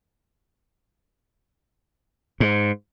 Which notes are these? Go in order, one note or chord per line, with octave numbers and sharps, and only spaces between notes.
G#2